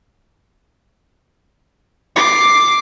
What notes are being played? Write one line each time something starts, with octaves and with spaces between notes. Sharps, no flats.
D6 C7